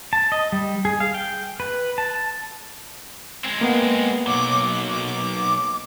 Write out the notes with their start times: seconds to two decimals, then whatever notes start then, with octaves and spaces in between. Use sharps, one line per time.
0.13 A5
0.32 D#5
0.52 G3
0.85 G#4
1.00 F5
1.14 G5
1.60 B4
1.98 A5
3.44 G#3 C4
3.61 A#3 B3 F#5
4.27 B1 F#3 D6
4.89 D6